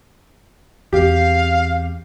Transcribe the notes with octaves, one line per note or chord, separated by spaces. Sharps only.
E2 C4 G4 F5